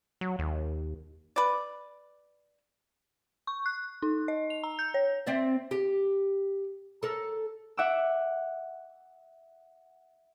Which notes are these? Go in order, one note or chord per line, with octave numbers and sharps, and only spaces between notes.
F#3
D#2
B4 D5
C#6
F#6
D#4
D#5
F7
A#5
G6
C#5
C4 D5 E5
G4
A4 A#4
E5 F#5 D6 E6